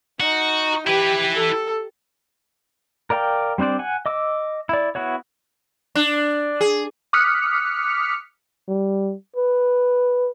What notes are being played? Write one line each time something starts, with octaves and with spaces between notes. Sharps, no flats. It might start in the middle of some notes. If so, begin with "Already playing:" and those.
D#4 F#4
E4 G4 B4
A4
A#4 D5 F5 G5
G3 C4 D4 C5 D5
F#5 G#5
D#5 D6 E6
E4 D5
B3 E4 F#4 C#5
D4
G#4
D6 D#6 F6 F#6 B6 C#7
G3
B4